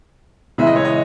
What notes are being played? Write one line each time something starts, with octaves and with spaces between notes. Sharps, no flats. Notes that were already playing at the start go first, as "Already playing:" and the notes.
C#3 E3 G#3 E5
D#5
C#5
D#5